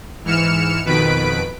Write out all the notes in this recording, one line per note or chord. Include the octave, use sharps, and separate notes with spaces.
G#2 E3 F6 C#7 E7
F2 B2 D#3 B4 B6 D7